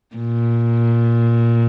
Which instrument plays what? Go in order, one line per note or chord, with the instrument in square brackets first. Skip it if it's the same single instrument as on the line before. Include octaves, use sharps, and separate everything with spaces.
[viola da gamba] A#2